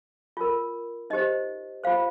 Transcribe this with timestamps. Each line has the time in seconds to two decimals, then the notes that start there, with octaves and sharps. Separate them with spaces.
0.37 F4 A#4
1.10 D#4 G4 C5 D#5
1.84 F4 C5 F5